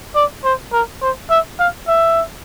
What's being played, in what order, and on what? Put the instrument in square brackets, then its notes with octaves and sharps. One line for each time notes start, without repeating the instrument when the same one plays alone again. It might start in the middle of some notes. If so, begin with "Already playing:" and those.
[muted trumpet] D5
C5
A#4
C5
E5
F5
E5